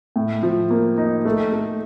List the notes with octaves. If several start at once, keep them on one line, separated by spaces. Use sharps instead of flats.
A2
F3
A#3
D#4
A3
A3